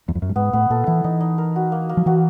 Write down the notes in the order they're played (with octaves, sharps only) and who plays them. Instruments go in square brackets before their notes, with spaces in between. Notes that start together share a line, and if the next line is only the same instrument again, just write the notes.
[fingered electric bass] E2
F2
F#2
G2
[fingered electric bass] G#2 [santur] B3
[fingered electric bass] A2 [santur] B3
[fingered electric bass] A#2 [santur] A4
[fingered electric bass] E3 [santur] E4
[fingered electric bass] E3 [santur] D#4
[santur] D#4
A#4
F#4
A#3
A#3
[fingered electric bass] F3
[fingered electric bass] E3 [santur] F#4